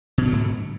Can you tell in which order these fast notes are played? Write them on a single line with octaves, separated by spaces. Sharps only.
B2 F#3 D3 G#2